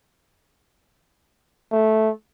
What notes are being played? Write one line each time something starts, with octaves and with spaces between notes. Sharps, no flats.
A3